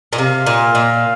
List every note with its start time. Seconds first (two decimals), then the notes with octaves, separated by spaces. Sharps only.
0.13 A#2
0.18 C3 F5
0.46 A#2
0.75 A#2